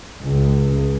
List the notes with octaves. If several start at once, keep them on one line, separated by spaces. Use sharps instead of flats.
C#2